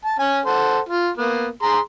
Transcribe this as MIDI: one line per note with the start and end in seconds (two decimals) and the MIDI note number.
0.05 0.16 81
0.19 0.40 61
0.19 0.40 80
0.46 0.79 69
0.46 0.79 72
0.46 0.79 78
0.89 1.09 65
1.17 1.48 58
1.17 1.48 59
1.63 1.79 68
1.63 1.79 82
1.63 1.79 84